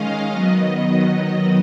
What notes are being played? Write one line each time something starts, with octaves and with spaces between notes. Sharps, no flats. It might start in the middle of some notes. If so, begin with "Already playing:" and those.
Already playing: D#3 G#3 C#4 D#5 F5
D#3 F#3 B3